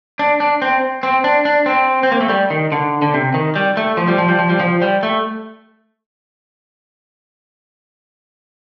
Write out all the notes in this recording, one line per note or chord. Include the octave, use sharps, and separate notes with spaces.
D4
D4
C4
C4
D4
D4
C4
C4
A#3
A3
G3
D#3
D3
D3
C3
D#3
G3
A3
F3
G3
F3
G3
F3
G3
F3
G3
A3